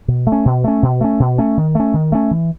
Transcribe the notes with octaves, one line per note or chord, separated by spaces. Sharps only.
B2
A3
C#4
B2
A3 C#4
B2
A3 C#4
B2
A3 C#4
D#3
A3 C#4
D#3
A3 C#4
E3